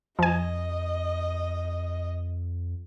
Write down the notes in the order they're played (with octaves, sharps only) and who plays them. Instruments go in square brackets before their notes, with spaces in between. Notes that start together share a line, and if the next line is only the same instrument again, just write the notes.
[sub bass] F2 [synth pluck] F3 G#5 [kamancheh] D#5